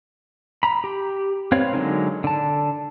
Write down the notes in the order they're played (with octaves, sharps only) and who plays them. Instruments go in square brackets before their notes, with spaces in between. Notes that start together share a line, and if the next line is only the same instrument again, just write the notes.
[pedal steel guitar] A#5 B5
G4
C4 B4 C#5 F5
D3 F#3 G#3 D#4 A#4
D3 A5